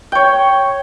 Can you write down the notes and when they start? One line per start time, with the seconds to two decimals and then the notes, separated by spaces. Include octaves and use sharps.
0.12 C#5 G5